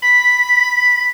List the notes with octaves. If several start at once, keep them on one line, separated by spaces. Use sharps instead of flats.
B5 B6